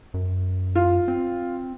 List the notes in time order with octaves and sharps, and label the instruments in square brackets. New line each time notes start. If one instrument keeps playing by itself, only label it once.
[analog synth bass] F#2
[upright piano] F4
[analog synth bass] C4